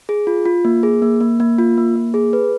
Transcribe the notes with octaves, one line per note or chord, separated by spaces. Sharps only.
G#4
F4
F4
A#3
G#4
A#3
A#3
A#3
F4
A#3
A#3
G#4
B4